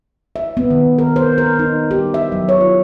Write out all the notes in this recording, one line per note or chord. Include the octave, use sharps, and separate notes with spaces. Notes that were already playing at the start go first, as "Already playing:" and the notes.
E5
B3
D#3
A#4
C5
A#4
D#4
G4
E5
F#3
C#5
F4